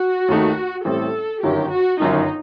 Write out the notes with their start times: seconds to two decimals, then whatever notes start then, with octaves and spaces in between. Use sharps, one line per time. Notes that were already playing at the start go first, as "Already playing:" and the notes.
Already playing: F#4
0.28 D#2 D#3 A3 D#4
0.85 A1 A2 G3 C4 A4
1.43 G1 F#2 D#3 F#3 G4
1.72 F#4
2.00 G1 F#2 D#3 D#4